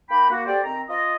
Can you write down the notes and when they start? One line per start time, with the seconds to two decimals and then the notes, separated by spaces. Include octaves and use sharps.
0.09 A#3 D#4 G5 B5
0.30 A#3 F#4
0.46 G4 A4 C5 D5
0.63 D#3 C4 A#5
0.88 F4 D#5